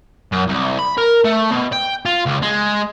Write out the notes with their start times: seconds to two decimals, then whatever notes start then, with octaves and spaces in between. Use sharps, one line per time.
0.32 F#2
0.48 C2
0.79 B5
0.98 A#4
1.25 A3
1.51 B2
1.73 G5
2.06 F4
2.26 C#2
2.42 G#3